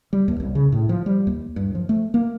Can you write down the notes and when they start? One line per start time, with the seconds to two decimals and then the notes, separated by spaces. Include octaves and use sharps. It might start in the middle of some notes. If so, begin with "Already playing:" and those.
0.13 G3
0.28 D#2
0.40 C2
0.55 C#3
0.72 A2
0.89 F3
1.06 G3
1.27 D#2
1.56 G2
1.75 F3
1.89 A3
2.14 A#3